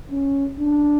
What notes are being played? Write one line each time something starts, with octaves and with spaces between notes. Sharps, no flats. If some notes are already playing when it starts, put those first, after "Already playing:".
C#4
D4